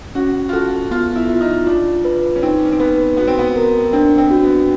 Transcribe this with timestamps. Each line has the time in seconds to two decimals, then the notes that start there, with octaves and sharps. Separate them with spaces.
0.15 C#4 F#4
0.49 F4
0.53 F#4 A4
0.91 B3 F4
1.15 E4
1.29 F4
1.41 D#4
1.66 D4 F4
2.05 B4
2.36 C#4
2.43 C4 D#4
2.65 C#4
2.72 C4
2.80 B3 B4
3.17 B3 F#4
3.28 C4
3.39 B3
3.56 A#4
3.93 C4 D4
4.18 C4
4.31 F#4
4.44 B3